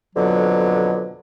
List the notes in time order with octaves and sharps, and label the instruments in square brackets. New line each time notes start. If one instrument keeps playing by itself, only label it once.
[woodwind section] F2 B2 D3 F#3